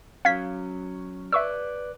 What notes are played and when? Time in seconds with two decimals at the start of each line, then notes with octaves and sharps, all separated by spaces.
0.25 F#3 C#4 F5 G#6 B6
1.32 B4 D5 E5 C#6 E6